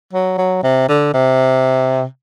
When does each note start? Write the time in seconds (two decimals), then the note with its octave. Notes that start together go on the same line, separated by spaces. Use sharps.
0.13 F#3
0.38 F#3
0.63 C3
0.89 D3
1.14 C3